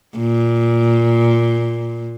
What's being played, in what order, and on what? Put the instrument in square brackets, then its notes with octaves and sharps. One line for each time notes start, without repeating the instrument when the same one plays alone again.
[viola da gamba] A#2